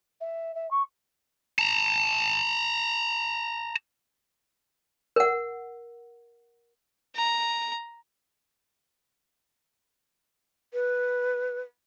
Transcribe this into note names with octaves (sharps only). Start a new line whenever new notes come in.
E5
E5
C#6
A5 A#5
A#4 F#5
A#5
B4